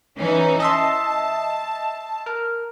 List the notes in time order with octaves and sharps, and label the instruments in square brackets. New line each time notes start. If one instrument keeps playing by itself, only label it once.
[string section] E3 C#4 D#4
[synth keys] D#5 E5 C6 [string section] A5
[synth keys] A#4